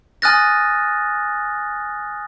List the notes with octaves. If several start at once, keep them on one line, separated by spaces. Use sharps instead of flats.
G#5 D#6 F6 F#6 A6 A#6